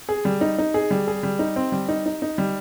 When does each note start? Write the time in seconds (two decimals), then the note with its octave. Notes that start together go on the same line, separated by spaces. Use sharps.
0.09 G#4
0.25 G3
0.41 D#4
0.58 D#4
0.74 G#4
0.91 G3
1.07 G#4
1.23 G3
1.39 D#4
1.56 C4
1.72 G3
1.89 D#4
2.06 D#4
2.22 D#4
2.38 G3